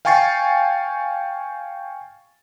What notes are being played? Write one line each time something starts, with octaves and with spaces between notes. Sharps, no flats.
F5 G5 G#5 C#6 A6 C7